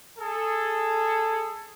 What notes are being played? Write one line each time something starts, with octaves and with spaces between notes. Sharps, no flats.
G#4 A4